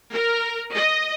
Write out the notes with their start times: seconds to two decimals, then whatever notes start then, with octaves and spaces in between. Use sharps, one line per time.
0.12 A#4
0.75 D#5